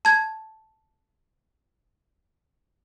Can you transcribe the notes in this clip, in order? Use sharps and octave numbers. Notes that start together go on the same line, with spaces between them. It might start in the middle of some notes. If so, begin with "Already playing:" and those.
A5 G#6